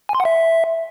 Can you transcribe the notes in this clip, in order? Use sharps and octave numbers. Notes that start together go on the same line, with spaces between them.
G#5
C6
F#5
E5